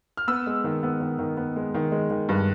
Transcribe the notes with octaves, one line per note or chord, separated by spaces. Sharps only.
F6
B3 E6
G#3
D#3
B3
D#3
D#3
B3
G#3
D#3
G#3
D#3
G2